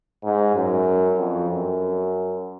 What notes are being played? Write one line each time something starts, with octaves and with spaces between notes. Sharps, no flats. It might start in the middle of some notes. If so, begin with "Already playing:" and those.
G#2
F#2
F2
F#2